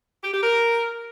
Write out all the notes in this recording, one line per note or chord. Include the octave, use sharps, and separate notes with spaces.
G4
G4
A#4